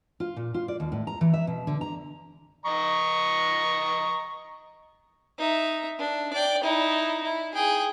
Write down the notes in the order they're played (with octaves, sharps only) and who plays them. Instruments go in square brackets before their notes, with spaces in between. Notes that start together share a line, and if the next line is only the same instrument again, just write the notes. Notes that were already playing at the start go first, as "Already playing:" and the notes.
[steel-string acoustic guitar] F4
A#2
F4
D5
D#2
A2
A#5
E3
E5
B2
D3
A#5
[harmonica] D#5 A#5 C#6
[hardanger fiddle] D#4 E5
D4
D5 G5
D#4 E4
E4
G#4 G5